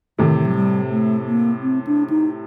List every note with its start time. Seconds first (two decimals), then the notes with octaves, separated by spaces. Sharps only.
0.18 A2 C3 D#3
0.39 D#3
0.46 F#3
0.55 G3
0.91 A3
1.27 A#3
1.62 C4
1.87 D4
2.10 D#4